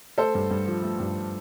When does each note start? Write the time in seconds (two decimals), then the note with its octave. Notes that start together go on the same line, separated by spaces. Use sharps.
0.18 A3 A4 C5
0.35 G2
0.50 G2
0.68 F3
0.83 A3
0.99 G2